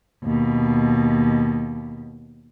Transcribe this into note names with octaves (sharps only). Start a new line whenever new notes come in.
D#2 B2